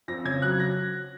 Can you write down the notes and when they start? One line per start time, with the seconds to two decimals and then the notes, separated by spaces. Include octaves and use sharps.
0.08 F2 A#6
0.25 C#3 G#6
0.42 F#3 F#6
0.60 A#6